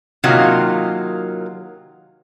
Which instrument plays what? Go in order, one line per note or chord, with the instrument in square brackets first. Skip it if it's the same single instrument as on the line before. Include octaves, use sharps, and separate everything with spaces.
[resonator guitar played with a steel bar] C3 D#3 F#3 A#3 F4